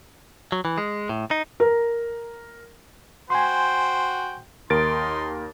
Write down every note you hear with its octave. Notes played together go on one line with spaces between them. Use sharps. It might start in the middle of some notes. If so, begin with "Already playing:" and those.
F#3
E3
G#3
A2
D#4
A#4
F#4 C5 G5 G#5 C6
D#2 D#4 A#4 C6 A6 D7